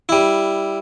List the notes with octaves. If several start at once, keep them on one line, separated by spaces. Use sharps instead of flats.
G3 E4